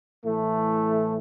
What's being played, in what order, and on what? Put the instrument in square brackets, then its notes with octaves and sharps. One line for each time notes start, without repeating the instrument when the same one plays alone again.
[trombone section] A2 E3 A3